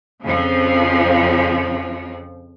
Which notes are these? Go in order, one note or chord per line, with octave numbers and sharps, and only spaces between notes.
F2 C#3 F3